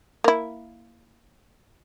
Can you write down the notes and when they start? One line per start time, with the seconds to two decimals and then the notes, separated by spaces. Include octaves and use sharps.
0.24 A#3 E4